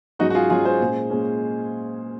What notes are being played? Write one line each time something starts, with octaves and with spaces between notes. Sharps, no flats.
G#2 F#3 C#4 D#4 F#4
F#4
F4 G#4
G#2 F#3 C#4 F4 G#4
G#4 C5
A#2 G#3 C#4
A#2 G#3 C#4